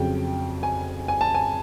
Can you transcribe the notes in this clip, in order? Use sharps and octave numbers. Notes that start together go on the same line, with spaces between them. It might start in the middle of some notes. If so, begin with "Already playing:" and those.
Already playing: F2 C#3 F#3 G5
G#5
G#5
A5
G#5